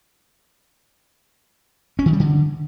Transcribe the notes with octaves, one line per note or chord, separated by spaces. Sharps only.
C#4
D#3
G3
D3